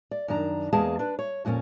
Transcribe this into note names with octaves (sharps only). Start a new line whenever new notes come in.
D5
F#2 D#3 D4 A#5
E2 G#3 A#3 G#4 F5 A5
D4 B4
C#5
F2 A#2 A#3 B3 C#4